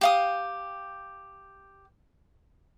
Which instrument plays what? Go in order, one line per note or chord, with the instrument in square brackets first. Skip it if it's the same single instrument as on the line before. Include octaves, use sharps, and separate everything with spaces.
[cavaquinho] G4 F5 D#6